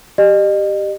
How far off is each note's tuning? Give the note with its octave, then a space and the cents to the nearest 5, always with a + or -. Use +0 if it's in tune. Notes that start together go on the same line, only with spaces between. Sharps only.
G4 +0 D#5 -40